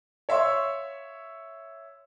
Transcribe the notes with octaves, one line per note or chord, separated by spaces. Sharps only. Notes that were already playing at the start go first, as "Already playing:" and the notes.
C#5 E5 F5 C6 C#6 E6